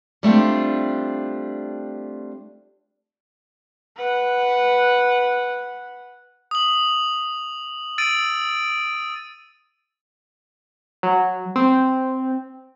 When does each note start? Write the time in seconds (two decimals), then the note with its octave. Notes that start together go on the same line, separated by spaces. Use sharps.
0.23 G3 A3 C4 D4 F4
3.97 B4 F#5
6.51 D#6 F#7
7.98 E6 A6 D7 D#7
11.03 F#3
11.56 C4